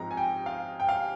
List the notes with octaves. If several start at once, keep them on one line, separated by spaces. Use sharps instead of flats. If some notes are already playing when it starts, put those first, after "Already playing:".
Already playing: G#2 F3 G#3 C4 D#4 A#5
G#5
G5
F5
G5
F5